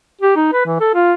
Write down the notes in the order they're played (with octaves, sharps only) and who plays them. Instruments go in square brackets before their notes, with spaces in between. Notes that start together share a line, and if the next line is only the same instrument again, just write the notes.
[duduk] G4
D#4
B4
E3
A4
F4